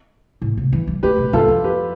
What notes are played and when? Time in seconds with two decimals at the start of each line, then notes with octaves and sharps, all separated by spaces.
0.42 A2
0.57 C3
0.72 E3
0.87 G3
1.03 A3 G4 B4
1.18 B2
1.33 G2 F4 A4
1.48 F2
1.64 G4 B4